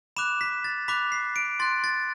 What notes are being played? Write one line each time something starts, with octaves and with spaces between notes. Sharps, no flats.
B5 D6 F#6 E7
B6
A6
B5 D6 F#6 B6
C7
D7
C6 F#6 A6
A6